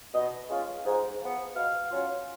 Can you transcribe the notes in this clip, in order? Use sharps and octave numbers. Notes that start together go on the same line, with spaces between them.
B2 D#5
G#3 C#4 F4
G#2
F3 B3
B2 F5
F#3 C#4 F4